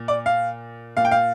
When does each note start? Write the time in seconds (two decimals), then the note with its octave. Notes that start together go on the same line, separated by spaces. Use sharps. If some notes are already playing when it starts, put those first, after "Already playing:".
Already playing: A#2
0.08 D5
0.26 F5
0.97 A#2 F5
1.05 G5
1.11 F5